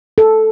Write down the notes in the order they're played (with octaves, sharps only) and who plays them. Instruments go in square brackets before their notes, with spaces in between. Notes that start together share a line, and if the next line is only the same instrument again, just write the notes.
[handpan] A4